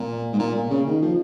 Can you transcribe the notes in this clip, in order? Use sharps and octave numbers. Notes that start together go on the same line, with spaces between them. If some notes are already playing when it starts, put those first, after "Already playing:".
Already playing: A#2
G#2
A#2
A#2
C#3
D#3
F3